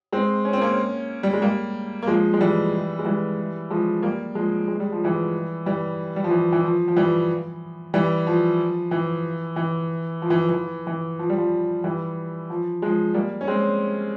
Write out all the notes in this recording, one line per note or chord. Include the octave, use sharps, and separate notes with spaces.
G#3 C4
C#4
C4
A#3 C#4
G3
G#3
G3 A#3
A#3
F3 G#3
G#3
E3 G3
G#3
E3 G3
F3 G#3
G3 A#3
F3 G#3
G#3
G3
F3
E3 G3
E3 G3
G3
F3
E3
E3
F3
F3
E3 G3
E3 G3
F3
E3
E3
F3
E3
E3
E3
F3
G3
F3
E3 G3
F3
F3 G#3
G3 A#3
C#4
G#3 C4